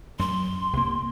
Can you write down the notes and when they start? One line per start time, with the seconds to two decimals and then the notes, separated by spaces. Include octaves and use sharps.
0.19 F#2 C6
0.73 C2 A#3